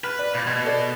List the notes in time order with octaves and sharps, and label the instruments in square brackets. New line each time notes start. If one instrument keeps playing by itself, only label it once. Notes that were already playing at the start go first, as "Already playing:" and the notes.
[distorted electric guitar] B4 [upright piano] F6
[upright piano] D5
[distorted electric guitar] A#2
[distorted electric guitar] B2 [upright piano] G#6
[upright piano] A4 D5